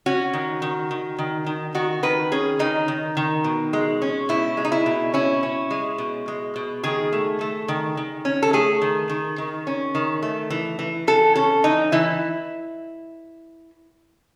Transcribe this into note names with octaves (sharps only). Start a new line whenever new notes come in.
C#4 F#4
D#3
D#3
D#3
D#3
D#3
D#3 F#4
D#3 B4
C#4 G#4
D#3 D#4
D#3
D#3
B2
G#3
C#4
B2 E4
G#3
D#4
E4
B2
C#4 E4
C#4
G#3
B2
G#3
B2
D#3 G#4
A3
A3
D#3
D#3
C#4
A4
A3 G#4
D#3
D#3
D#3
C#4
D#3
A3
E3
E3
E3 A4
C#4 A4
E3 D#4
E3 E4